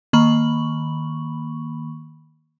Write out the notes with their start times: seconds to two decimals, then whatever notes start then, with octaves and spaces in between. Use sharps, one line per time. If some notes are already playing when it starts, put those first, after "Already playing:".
0.13 D#3 A#3 B5 C#6 F#7